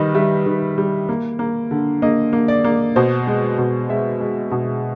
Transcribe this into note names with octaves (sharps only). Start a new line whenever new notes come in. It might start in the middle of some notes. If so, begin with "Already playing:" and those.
Already playing: D#3 G3 B4 D#5
G3 E5
D#3
G3
A#3
A#3
D3
A#3 D#5
A#3
D5
A#3
B2 C5
G#3
B2
G#3 E5
G#3
B2